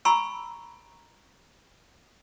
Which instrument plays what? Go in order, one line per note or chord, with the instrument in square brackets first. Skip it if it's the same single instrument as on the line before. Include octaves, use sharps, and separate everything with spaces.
[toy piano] G#5 A#5 B5 C#6 E6